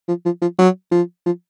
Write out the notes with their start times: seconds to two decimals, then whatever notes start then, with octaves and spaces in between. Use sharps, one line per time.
0.08 F3
0.25 F3
0.42 F3
0.59 F#3
0.92 F3
1.26 F3